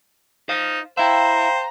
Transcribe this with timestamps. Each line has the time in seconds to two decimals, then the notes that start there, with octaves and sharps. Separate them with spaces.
0.49 D#4 C5 F5
0.97 E4 C5 E5 F5 G5 A#5